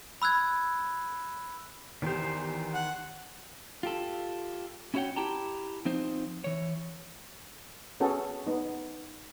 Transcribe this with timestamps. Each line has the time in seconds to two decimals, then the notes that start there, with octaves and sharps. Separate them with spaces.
0.22 B5 E6 F#6 G#6
2.02 E2 D#3 G4 C5
2.74 F#5
3.83 F4 G4 A4
4.94 C#4 E4 F#4 C#5 F#5 G5
5.16 E4 G4 G5 A5 A#5
5.85 F3 C4 D#4 C5
6.44 E3 C#5
8.00 B3 C#4 F#4 G#4 A4
8.47 B3 D#4